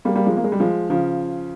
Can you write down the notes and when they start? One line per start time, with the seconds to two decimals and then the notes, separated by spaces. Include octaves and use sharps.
0.05 G3 A#3
0.15 G3 A#3
0.26 F3 G#3
0.37 A#3
0.44 G#3
0.52 G3
0.60 F3 G#3
0.90 C#3 F3